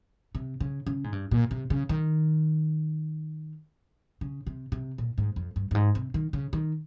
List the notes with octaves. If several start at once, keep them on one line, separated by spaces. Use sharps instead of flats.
C3
C#3
C#3
G#2
G2
A#2
C3
C#3
D#3
C#3
C3
C3
A#2
G#2
F2
G2
G2
G#2
C3
D#3
C#3
D#3